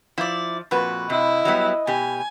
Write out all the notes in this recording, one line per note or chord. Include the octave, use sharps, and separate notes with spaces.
F3 E4 D5
F2 A#2 F#4 B4
C3 E4 D#5
F#3 G3 B3
B2 G4 G#5